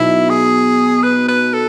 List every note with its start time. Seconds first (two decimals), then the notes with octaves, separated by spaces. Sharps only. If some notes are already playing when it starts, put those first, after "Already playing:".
Already playing: B2 F#3 B3 D#4 E4
0.30 G#4
1.03 B4
1.29 B4
1.53 A4